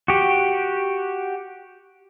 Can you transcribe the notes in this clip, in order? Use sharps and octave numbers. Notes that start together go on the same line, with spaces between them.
F#4 G4